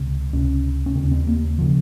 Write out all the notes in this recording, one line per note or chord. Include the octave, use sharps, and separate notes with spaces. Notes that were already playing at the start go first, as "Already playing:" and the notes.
Already playing: C#2 C3
C#2 C3 C#4
C#4
D#2 C#3 C4
C4
A#3
C#3 F3